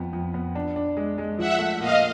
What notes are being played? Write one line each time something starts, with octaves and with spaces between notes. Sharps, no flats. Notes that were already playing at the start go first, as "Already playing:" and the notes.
Already playing: F2 B3
F2
B3
D4
D4
G#3
G#3
F3 E5 F#5
A3
A#2 D#5 F5